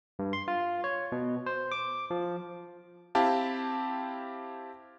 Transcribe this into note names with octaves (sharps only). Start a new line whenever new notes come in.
G2
C6
F4
C#5
B2
C5
D6
F3
C4 E4 G4 F5 A5